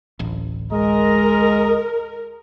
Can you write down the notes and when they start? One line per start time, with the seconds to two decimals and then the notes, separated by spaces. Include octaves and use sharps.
0.19 D1 A1
0.72 G#3 A#4 D#5 A#5